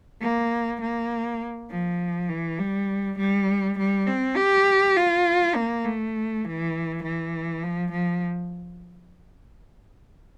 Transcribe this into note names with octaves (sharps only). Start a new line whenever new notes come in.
A#3
A#3
F3
E3
G3
G3
G3
C4
G4
F4
A#3
A3
E3
E3
F3
F3